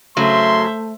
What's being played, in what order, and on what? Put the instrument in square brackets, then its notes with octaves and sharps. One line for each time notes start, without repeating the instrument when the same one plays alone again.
[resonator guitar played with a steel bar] C#3 F#3 [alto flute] A3 [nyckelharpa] C5 E5 [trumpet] C6